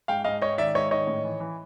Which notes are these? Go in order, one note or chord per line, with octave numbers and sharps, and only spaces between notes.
G#2 F5 G5
G#2 D#5 F5
G#2 C#5 D#5
D#3 D5 E5
G#2 C#5 D#5
D#3 C#5 D#5
A2
E3
E3